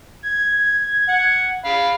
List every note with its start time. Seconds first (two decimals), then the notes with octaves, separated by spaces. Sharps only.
0.23 G#6
1.09 F#5
1.65 F5 B5